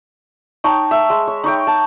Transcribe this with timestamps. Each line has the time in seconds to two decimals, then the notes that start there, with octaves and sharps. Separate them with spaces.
0.64 D#4 C#5 G5 A5
0.91 E5
1.10 G#3
1.27 C#5
1.44 D#4 C#5 G5
1.67 A5